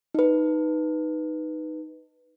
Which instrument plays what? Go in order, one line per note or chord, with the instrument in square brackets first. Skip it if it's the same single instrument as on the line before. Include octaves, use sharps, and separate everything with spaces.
[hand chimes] D#4 B4